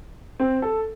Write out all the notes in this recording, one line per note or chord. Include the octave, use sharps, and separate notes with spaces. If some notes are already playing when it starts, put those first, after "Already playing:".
C4
A4